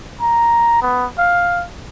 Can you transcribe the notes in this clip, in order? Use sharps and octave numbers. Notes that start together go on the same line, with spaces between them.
A#5
B3
F5